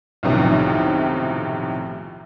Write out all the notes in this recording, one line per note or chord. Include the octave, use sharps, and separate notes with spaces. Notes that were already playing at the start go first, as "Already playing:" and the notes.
B1 F#2 A2 C3 D#3 F3